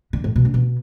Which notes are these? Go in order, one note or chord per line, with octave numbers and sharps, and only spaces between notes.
D3
A2
B2
D3
B2